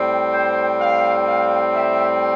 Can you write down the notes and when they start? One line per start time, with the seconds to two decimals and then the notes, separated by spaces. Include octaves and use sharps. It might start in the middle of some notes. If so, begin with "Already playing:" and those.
Already playing: A2 G3 C4
0.34 C5
0.80 F5
1.27 F5
1.75 E5